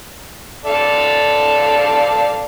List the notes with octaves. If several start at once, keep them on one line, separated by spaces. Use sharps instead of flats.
A4 D5 F5